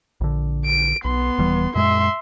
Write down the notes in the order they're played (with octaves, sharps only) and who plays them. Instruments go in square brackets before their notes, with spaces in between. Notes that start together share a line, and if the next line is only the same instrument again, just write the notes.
[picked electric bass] A#1 D3
[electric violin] D7
[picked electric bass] B1 [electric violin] B3 C6
[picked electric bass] D#1 E3 G3
[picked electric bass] F#2 A#2 G#3 [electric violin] E5 C6